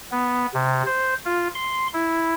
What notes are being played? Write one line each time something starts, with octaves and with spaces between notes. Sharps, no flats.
B3
C3
C5
F4
C6
E4